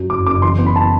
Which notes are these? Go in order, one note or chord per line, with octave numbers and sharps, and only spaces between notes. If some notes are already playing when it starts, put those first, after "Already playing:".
Already playing: F#2 F#3
F#1 D6
F#1 D6
E3 C6
B3
B5
A5